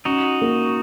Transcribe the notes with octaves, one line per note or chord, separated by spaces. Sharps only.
C#4 D#4 F#4
A#3